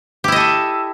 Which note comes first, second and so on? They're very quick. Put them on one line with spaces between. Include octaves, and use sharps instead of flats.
G4 E4 D#5 A4 E5